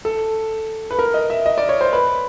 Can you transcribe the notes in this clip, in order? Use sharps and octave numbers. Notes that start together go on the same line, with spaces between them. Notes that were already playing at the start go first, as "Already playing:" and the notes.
A4
B4
A#4
D#5
E5
D#5
D5
C#5
C5
B4